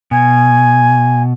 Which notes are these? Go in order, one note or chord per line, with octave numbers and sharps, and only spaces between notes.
B2 G#5